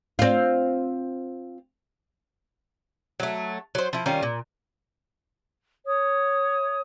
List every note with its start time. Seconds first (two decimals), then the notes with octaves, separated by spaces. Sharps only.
0.19 C4 F4
3.20 F#3 A3
3.75 F#3 C5
3.93 F3 E4
4.06 D#3 G3 C#4 F4
4.23 A#2
5.84 C#5 D#6